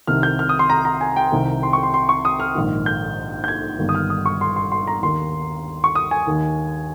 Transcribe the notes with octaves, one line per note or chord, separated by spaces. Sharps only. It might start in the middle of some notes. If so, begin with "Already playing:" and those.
C2 C3 D#3 F6
G6
F6
D#6
C6
A#5
A#5
G#5
G5
C2 C3 D#3
C6
C#6
C6
C6
C#6
D#6
F6
A#1 G#2 D#3
G6
G6
G#6
G1 G2 D#3
D#6
F6
D#6
C#6
C6
C6
C6
A#5
D#2 D#3 C6
C#6
D#6
G#5
D#2 D#3